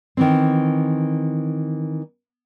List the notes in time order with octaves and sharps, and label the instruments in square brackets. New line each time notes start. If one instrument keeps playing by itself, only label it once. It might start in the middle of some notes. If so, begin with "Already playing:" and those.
[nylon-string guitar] D#3 E3 C4